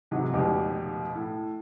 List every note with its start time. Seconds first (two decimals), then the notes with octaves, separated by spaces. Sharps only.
0.11 G#2 C3 E3 F#3 G#3
0.33 F1 C#2 B2 D#3 G4
1.16 A2